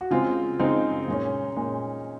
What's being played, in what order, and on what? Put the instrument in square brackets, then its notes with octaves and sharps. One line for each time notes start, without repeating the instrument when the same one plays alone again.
[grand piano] F#4
C#3 G#3 C4 F4
C#3 G#3 C4 D#4
A#2 G#3 C#4
A#2 G#3 C#4